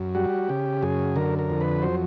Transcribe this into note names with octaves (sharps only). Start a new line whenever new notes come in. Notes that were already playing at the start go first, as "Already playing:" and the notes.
Already playing: F#2
G3 F#4
C#3 G4
F#2 G#4
D3 A#4
A#4
F2
B4
F#3 C5